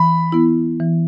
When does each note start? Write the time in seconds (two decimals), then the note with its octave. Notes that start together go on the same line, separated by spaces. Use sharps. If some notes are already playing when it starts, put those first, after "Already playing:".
Already playing: E3 B5
0.32 B3 E4
0.80 E3